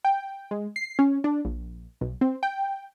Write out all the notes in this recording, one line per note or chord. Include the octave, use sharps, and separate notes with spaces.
G5
G#3
C7
C#4
D4
A#1
B1
C4
G5